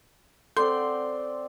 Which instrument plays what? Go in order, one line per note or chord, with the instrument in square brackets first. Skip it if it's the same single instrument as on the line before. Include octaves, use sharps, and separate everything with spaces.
[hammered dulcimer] C4 D5 F#5 [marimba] A4 [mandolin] C6